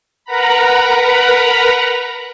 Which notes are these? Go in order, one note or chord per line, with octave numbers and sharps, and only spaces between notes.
A#4 B4 F#5 A#5 B5